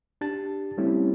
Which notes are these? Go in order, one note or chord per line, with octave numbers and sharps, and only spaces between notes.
D4 G4 A5 A6
G3 A3 C4 C#4 E4 G4